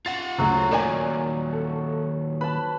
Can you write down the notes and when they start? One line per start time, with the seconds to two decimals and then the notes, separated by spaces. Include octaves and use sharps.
0.06 F4 F#5 A6
0.38 D2 C#3 F#3 F#4
0.71 A#2 D#3 A#4 D5 G#5
1.53 A4
2.41 B4 A5 B5